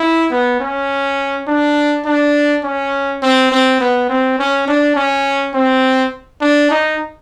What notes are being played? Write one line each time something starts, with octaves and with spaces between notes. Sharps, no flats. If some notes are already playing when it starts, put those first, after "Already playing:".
Already playing: E4
B3
C#4
D4
D4
C#4
C4
C4
B3
C4
C#4
D4
C#4
C4
D4
D#4